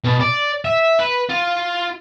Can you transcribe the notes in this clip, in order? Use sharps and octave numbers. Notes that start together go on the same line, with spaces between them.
B2
D5
E5
B4
F4